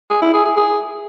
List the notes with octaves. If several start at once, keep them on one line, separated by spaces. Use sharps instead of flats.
G#4
E4
G#4
G#4
G#4